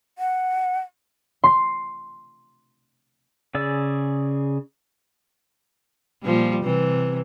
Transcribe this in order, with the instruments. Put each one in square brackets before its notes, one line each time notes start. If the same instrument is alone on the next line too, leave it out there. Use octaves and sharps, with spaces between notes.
[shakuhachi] F#5
[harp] C6 C7
[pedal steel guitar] C#3 G#4 D5 E6
[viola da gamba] A#2 F3 G3
C3 E3